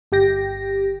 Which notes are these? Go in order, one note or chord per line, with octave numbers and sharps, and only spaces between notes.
G1 G4 G5 A#6